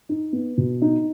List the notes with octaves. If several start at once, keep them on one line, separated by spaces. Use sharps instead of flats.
D#4
B3
B2
D#4